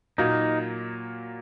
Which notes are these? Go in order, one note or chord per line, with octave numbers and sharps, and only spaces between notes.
A#2 F#3 A#3 D#4